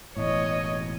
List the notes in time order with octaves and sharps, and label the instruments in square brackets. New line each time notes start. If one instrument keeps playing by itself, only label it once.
[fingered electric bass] E1 E2 A2 [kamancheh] C#5 D#5